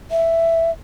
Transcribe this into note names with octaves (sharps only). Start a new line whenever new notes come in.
E5